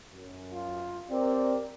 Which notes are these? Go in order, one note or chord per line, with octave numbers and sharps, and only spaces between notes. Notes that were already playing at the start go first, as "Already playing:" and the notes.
F#2
F4
C4 G4 A#4 D5